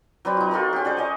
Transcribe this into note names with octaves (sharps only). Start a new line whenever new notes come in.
F#3 C4 B4 D5
D#4 F4
F4 F#4 A4 A#4
C#4 G4
C5 D5 F#5
C#5 D#5 G#5